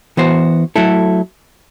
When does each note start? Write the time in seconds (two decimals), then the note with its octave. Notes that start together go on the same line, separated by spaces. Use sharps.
0.17 E3 B3 F#4 C5
0.76 F#3 A3 E4 A4